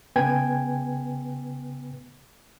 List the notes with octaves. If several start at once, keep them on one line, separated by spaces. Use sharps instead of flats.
C#3 B3 B4 G5 G#5 G#6